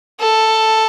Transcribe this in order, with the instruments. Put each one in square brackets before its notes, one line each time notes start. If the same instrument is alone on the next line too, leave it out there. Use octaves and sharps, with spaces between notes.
[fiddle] A4